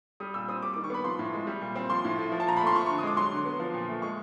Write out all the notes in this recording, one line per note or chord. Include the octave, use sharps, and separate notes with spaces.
G3 D#6
A#2 E6
C4 D#6
G3 D6
D#3 D6
C#6
B3 B5
F3 C6
A2
G#3
G3
A#2
C4
F3 C6
A2
A3
F3
A5
A#2 A#5
B5
A3
C6
F3 C#6
D3 C#6
D#6
G#3 D6
F#3 C6
D3
B3
F3
A#2
A3
G#3 C#6